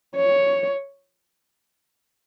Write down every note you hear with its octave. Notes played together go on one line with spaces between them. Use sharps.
C#5